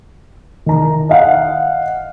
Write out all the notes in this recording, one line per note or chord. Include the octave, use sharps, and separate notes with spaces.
D#3 A#5
D#5 F5 F#5